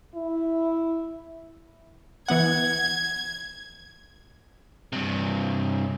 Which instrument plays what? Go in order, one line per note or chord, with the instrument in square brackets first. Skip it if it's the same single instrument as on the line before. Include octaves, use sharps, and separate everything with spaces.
[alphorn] E4
[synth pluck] E3 B3 F#5 [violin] G#6
[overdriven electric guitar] G2 C3